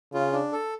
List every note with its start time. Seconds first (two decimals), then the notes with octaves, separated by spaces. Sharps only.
0.13 C#3 F4
0.33 D4
0.53 A4